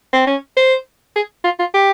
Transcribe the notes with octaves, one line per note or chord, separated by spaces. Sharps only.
C4
C#4
C5
G#4
F4
F4
G4